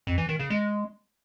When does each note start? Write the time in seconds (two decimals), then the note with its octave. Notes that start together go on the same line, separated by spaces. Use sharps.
0.07 F2
0.18 E3
0.29 D#3
0.39 C#3
0.50 G#3